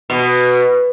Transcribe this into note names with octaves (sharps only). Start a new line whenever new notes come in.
B2